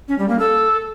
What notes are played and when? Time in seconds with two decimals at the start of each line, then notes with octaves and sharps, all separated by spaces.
0.08 C#4
0.19 G3
0.29 A#3
0.39 A4